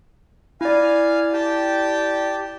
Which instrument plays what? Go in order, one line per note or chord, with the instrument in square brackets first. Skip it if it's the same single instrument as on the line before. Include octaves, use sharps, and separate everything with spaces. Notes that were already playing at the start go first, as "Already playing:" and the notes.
[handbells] E4 D5 [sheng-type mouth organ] F5 G#5
[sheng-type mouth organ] G4 G5 A5